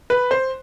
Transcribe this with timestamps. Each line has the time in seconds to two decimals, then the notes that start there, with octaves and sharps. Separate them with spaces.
0.10 B4
0.31 C5